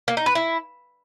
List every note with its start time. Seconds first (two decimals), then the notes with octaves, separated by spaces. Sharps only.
0.08 A#3
0.17 D#4
0.26 B4
0.35 E4